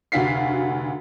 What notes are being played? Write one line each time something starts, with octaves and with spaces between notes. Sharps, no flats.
F1 D2 F#4 F5 B6 C7